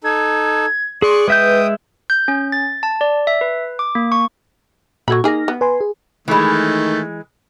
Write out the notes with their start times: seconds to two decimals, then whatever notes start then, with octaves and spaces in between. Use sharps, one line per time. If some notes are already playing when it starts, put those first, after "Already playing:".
0.04 D#4 A4 G#6
1.02 G#4 D5 C6 C#6 F#6
1.28 G#3 B4 E5 G5 D#6 G6
2.10 G6
2.28 C#4
2.52 A6
2.83 A5
3.01 D5
3.27 E5
3.41 B4
3.79 D6
3.95 A#3
4.12 C#6
5.08 A#2 F#3 F#4 A4 B5 G#6
5.24 A#3 D#4 G#4 F6 A#6
5.48 B3
5.61 B4 G#5 C6
5.81 G#4
6.28 D#3 E3 G#3 A3